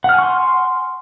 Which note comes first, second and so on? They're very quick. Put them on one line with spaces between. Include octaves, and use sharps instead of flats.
F#5 F6 G#5 C#6 C6